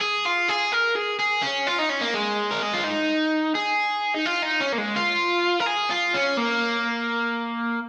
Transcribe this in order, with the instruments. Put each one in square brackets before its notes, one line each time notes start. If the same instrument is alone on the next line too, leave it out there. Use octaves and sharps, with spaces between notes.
[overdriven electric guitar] G#4
F4
G#4
A#4
G#4
G#4
C#4
F4
D#4
C#4
A#3
G#3
A#4
G#4
F4
D#4
G#4
D#4
F4
D#4
C#4
A#3
G#3
F4
A#4
G#4
F4
C#4
A#3